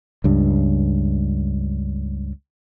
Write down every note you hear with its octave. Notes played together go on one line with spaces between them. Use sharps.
C#2 G2